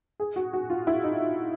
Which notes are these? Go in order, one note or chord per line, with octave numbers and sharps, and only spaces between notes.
G#4
F#4
F#4
F4
E4
D#4